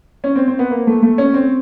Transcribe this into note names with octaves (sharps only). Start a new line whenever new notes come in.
C#4
C4
C4
B3
A#3
A3
A3
C#4
C4